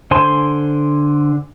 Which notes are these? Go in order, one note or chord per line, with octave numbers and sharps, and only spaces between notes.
D3 C5 G#5 C6